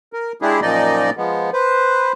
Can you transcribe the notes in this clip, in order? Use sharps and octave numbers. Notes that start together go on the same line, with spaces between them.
A#4
G#3 D4 E4 G4 G#4
F#2 A#2 F3 D#4 D5 D#5
F3 G#3 B3
B4 C5